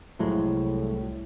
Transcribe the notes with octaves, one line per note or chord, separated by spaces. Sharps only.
C2 A2 F3 F#3 G#3